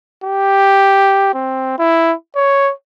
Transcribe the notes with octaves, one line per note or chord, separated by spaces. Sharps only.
G4
C4
E4
C#5